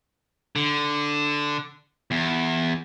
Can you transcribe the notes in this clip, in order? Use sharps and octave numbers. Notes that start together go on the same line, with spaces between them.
D3
E2